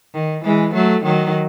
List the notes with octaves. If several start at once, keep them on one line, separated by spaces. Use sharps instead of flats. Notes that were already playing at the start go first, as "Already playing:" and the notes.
D#3
E3 G#3
F#3 A3
D#3 F#3